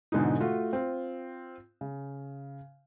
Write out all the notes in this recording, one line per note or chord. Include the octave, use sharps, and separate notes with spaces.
G#2 B2 D3 E3 D#4
A3 F4 F#4
C4 F4
C#3